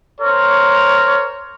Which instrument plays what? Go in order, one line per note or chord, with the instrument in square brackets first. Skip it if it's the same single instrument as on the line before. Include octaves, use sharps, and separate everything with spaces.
[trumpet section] A#4 C5 C#5